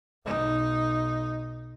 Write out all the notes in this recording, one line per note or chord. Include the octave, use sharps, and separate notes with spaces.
B1 D#4